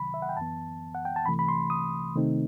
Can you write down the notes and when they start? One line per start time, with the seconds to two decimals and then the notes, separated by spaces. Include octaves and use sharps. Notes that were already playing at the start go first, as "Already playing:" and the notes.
Already playing: C2 C3 D#3 F#3 B5
0.14 E5
0.22 F#5
0.29 G5
0.37 F#2 E3 B3 A5
0.95 F#5
1.05 G5
1.16 A5
1.26 C2 C3 E3 A3 B5
1.39 B5
1.49 C6
1.70 D#6
2.15 C3 D#3 A3 C4 D#4